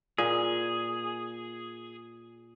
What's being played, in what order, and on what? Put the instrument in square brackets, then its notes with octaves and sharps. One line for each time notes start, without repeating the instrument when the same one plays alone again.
[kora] A#2 [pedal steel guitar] G#4